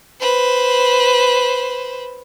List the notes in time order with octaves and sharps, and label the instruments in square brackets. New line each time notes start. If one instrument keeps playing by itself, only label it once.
[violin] B4 C5